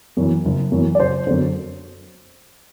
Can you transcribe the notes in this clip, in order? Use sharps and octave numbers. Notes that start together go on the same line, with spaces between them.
F#2 E3
F#1
F#2 E3
D5
F#1 C5
F#2 D3 C5